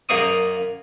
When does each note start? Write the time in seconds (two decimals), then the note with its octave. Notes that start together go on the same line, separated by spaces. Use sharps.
0.09 F#2 A#3 D5 F5 C#6 D#6